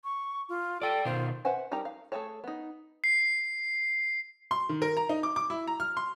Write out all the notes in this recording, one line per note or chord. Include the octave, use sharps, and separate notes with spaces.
C#6
F4
A4 D5 G5
B2 D#3 F4 C5
B4 C5 E5 F#5 G#5
G3 D#4 G4 A#4 A#5
F5
A3 C4 G#4 A4 C#5
B3 D#4
C7
C6
D#3
A#4
A#5
D#4
D6
D6
E4
A#5
F6
C6